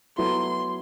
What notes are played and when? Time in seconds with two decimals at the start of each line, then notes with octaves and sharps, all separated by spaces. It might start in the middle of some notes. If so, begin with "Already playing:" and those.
0.18 F#3 B3 E4 A4 C6